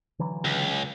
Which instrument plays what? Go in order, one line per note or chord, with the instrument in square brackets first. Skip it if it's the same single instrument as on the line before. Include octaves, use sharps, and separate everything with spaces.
[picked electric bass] D3 E3 F#3
[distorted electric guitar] C#2